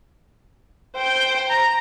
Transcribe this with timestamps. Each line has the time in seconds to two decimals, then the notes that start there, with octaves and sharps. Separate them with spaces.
0.97 C5 G5
1.49 A#5